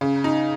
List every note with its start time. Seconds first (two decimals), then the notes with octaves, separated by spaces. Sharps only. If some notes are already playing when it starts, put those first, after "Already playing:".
0.01 C#3
0.24 D#4